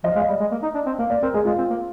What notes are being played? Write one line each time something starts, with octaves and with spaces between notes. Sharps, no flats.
F3 D#5
F5
G#3
D#5
G3
G#3
A#3
D#4
D4
C4
A#3 F5
A#3 D5
C4 A#4
G#3 G#4
G#3 F4
C4
A#3